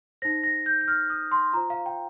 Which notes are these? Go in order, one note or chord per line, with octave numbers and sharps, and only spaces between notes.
D#4 C5 A#6
A#6
G6
G6
F6
D#6
C6
F4 C5 A#5
F5
G5